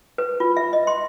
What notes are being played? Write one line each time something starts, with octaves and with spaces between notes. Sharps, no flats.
B4
F4
E5
D#5
C6